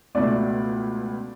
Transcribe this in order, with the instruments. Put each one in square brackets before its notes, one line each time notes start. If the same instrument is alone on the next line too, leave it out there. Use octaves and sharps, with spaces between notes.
[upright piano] C#2 B2 A3 D5